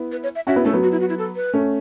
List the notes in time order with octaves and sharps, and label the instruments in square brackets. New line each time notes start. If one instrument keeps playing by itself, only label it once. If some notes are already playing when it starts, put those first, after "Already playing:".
Already playing: [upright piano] B3 E4
[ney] B4
C#5
E5
[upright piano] C#4 F#4 [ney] E5
[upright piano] B3 E4
[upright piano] A3 C#4 [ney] A4
[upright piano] F#3 B3
[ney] F#4
E4
F#4
E4
A4
B4
[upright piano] A3 C#4